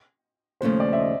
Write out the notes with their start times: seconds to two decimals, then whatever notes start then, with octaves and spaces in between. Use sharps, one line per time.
0.61 D#2 C#3 F3 A3 C5
0.80 D5
0.93 E5
0.99 D#5